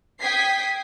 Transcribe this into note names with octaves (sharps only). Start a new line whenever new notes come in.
G5 D#6 G#6 B6 C7